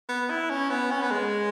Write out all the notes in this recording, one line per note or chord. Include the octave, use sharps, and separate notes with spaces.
B3
E4
C#4
B3
C#4
B3
G#3